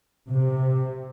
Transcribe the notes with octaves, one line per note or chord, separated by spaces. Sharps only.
C3